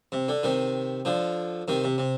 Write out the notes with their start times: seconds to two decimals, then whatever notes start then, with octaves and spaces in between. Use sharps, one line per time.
0.12 C3
0.29 D3
0.43 C3 D#3
1.05 D3 F3
1.68 C3 D#3
1.84 C3
1.98 C3